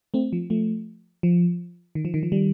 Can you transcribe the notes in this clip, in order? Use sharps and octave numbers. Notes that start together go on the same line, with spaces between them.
A3 C4
F3
F3 A3
F3
D#3
F3
D#3
F3
D#3 G3